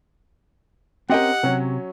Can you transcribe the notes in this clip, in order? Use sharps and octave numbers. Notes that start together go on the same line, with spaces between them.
C4 C#4 G4 A#4 D#5 F#5 G5
C3 F#3 C#4